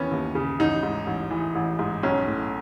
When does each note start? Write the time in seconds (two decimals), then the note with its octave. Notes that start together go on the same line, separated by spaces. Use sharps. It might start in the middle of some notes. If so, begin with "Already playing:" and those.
Already playing: D#2 E3 B3 C#4
0.11 D#2
0.35 C#3
0.59 A1 D#4
0.83 G#2
1.07 A1
1.31 E3
1.55 A1
1.79 G#2
2.03 B1 C#4
2.27 A2